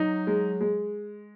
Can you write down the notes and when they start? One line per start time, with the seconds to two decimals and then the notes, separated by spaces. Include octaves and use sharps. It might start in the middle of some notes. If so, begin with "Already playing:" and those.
Already playing: F#3 D#4
0.27 G#3
0.61 G#3